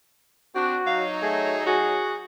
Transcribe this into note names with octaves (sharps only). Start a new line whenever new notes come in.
C4 D4 F#4
F#3 D#4 F5
A3 G#4
F#4 G#4